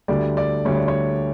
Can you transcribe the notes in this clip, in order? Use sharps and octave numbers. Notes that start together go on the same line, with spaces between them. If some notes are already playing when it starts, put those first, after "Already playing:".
D2 D3 G3 D5
D5
D2 D3 G3 C#5
D5
C#5